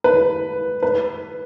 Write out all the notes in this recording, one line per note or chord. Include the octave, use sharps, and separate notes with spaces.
B4
B4